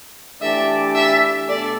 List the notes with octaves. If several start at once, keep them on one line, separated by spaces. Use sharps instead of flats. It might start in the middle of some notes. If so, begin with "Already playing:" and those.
E3 A3 D4 G4 D5 E5
E5
B2 A3 D4 A4 D5